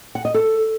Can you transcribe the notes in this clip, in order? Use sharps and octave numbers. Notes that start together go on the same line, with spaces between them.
F#5
D#5
A4